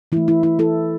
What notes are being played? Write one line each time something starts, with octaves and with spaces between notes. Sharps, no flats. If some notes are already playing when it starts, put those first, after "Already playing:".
E3 A3 E4
E4
E4
E4 A4